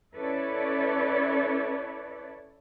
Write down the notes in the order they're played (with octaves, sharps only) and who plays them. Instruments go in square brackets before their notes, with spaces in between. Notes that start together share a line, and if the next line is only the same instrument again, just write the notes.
[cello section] C#4 E4 A4 B4 C#5 D5